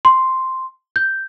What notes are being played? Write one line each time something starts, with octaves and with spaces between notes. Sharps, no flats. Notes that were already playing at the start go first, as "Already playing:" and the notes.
C6
G6